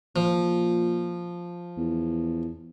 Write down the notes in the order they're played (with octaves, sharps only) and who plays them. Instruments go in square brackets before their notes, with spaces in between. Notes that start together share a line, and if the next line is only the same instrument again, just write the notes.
[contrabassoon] A#2 [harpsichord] F3
[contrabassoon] E2